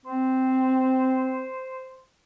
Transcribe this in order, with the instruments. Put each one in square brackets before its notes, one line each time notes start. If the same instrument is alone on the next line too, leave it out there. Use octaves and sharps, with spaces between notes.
[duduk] C4 [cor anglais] C5